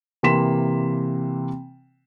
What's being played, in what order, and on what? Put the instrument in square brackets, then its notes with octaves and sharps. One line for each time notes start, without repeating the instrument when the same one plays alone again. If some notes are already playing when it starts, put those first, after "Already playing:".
[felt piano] C3 E3 A#3 C6 B6 E7